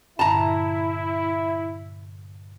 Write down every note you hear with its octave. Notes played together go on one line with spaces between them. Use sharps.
G2 A#2 D3 E4 A5 A#5